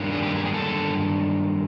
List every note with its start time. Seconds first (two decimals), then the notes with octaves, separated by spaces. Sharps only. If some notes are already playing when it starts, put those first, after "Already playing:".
Already playing: G2 D#3 F#3 A#3 D4
0.12 G#4
0.23 G4
0.35 G#4
0.46 G#4
0.54 A4